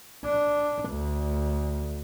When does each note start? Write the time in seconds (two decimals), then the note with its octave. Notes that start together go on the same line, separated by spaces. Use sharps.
0.25 D4
0.90 D2